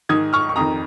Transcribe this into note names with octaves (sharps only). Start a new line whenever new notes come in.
G#2 D#3 D#6 G#6
C#6 F6
C#6
F2 D#3 A#5 D#6